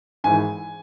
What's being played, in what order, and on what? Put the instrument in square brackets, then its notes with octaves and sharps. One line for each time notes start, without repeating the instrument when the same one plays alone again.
[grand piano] G#1 G#2 E3 G#5